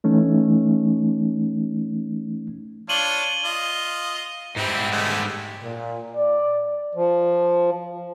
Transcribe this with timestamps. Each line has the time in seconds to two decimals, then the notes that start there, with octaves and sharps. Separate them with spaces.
0.04 E3 A3 C#4 D#4
2.89 D4 F4 C#5 D#7 F#7 G7
3.45 F4 D#5
4.57 G#2 G3 C4 E4
4.91 D3 G#3 A3
5.63 A#2
6.15 D5
6.95 F3